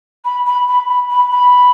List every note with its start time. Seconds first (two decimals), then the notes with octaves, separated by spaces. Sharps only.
0.25 B5
0.46 B5
0.68 B5
0.89 B5
1.10 B5
1.31 B5